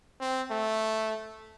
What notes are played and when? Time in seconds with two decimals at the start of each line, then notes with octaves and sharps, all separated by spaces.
0.21 C4
0.51 A3